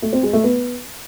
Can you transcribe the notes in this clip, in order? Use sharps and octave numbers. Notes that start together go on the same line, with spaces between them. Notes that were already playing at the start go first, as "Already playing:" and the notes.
A3
C4
G#3
A3
B3